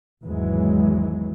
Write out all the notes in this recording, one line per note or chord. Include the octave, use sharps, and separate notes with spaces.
G#1 E2 E3 F#3 G#3